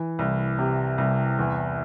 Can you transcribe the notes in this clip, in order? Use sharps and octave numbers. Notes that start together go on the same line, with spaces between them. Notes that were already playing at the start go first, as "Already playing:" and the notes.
Already playing: E3
C2
C3
C2
E2